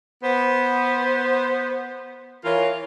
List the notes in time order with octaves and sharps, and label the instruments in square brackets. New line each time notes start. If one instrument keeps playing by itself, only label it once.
[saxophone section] B3 C5
E3 F4 A#4 C#5